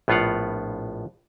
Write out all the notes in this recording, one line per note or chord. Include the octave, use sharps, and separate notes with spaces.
A#1 A2 B3 F4 F5 F#5